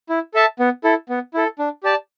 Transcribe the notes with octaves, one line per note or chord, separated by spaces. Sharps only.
E4
A4 E5 A5
B3
E4 A4
B3
E4 A4
D4
G4 D5 A5